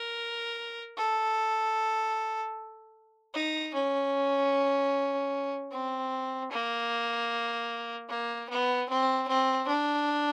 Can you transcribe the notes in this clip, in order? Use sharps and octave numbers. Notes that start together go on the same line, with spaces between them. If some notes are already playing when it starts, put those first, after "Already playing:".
Already playing: A#4
A4
D#4
C#4
C4
A#3
A#3
B3
C4
C4
D4